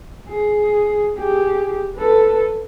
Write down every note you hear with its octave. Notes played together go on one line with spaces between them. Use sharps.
G#4
G4 G#4
A4 B4